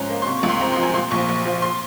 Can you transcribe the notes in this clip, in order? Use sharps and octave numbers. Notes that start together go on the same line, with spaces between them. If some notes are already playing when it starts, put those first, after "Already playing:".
Already playing: G#2 F3 C#4 A#5 C6
A#3
C6
C3 C#6
C#6
C#2
C6
C4 A#5
F3 C6
G#5
A#2 C6
A#1 C#6
A#1
F3
C6